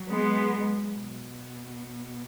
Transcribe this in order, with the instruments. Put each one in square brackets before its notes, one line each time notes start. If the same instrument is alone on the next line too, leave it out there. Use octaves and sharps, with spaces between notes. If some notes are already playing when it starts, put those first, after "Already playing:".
Already playing: [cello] F#3
[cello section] G#3 B3
[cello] B2